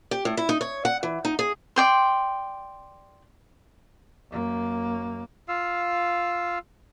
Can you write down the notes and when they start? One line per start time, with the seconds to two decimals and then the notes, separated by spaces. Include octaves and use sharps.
0.11 G4
0.25 A2
0.37 E4
0.49 D#4
0.61 C#5
0.85 F#5
1.03 E3
1.25 D#4
1.39 G#4
1.76 D5 G5 C6
4.29 F#2 A#3
5.48 F4 F5 E6